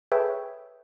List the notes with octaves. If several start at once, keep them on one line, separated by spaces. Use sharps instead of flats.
G#4 A4 B4 C#5 E5 G5